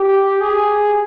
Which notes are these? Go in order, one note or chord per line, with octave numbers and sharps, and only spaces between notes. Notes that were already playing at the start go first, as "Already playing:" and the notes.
Already playing: G4
G#4